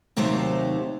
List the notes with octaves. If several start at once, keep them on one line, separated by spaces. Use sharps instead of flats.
D#2 C3 F#3 A3 D#4 C5